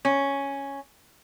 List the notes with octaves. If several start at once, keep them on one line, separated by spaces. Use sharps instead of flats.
C#4